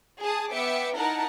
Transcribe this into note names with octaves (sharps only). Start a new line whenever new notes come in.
G#4 A5 D#6
B3 E5 G5 D6 C#7
D#4 E4 A#4 F#5 A5 A#5